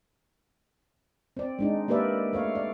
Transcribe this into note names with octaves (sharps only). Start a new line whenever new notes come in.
C4 D5
G#3 D4 D#4
A#3 G4 A#4 B4 D5 E5
A3 C#5 F5
D5